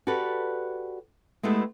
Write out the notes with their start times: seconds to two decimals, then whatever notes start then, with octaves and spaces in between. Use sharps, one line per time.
0.07 F#4 G4 A4 B4 D5
1.43 G#3 A3 B3 E4 G4